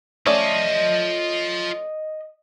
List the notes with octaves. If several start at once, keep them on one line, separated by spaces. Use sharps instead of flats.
A3 C#4 F4 D5 D#5 A5